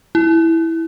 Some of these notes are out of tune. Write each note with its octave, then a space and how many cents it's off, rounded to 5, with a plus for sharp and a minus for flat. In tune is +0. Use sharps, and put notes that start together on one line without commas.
E4 -5